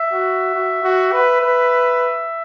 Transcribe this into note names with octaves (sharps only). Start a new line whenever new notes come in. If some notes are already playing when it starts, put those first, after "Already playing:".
Already playing: E5
F#4
F#4
F#4
B4
B4